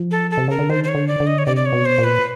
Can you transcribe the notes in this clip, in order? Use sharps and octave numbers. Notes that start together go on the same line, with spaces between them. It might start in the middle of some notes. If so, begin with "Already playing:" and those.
Already playing: F3
A4
A4
C3
C#3 A#4
D3
D#3 C5
C5
C#5
D3
D5
D3
D#5
C#5
C3 D5
D5
C#5
B2
C5
A#2
B4